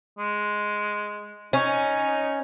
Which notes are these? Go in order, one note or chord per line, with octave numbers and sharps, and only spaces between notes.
G#3
C#4 D#4